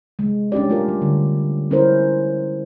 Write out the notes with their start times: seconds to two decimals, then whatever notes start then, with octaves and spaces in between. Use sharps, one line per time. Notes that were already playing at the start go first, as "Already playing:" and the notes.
0.19 C3 G#3
0.52 C#4 D4 G4 D5
0.70 A3 F4 A#4
0.88 G3
1.02 D3 D#3 G3
1.70 G3 C#4 E4 A#4 C5